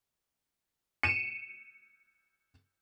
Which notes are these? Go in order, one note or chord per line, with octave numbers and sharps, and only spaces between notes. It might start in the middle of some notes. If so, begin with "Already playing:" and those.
C#7 D#7 E7